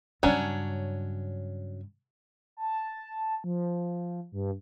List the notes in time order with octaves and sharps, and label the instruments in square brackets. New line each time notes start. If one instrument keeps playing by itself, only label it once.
[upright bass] G2 C#3 [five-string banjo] F#3 C#4 D4
[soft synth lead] A5
F3
G2